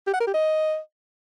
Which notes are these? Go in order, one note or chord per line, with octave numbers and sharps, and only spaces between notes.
G4
F#5
A#4
G4
D#5